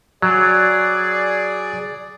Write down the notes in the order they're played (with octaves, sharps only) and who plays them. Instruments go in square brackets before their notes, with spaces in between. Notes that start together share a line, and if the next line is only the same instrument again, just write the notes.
[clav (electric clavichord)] F#3 [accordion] G#4 D5